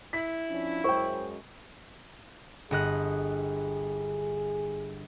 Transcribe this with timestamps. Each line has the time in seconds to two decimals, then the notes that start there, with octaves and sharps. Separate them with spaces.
0.13 E4 B6
0.50 F3 C#4 D4
0.84 F#2 G#3 C5 G5 C#6
2.71 G1 G#4 D#5 F#6